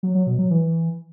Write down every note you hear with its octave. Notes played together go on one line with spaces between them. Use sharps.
F#3
F#3
B2
F#3
E3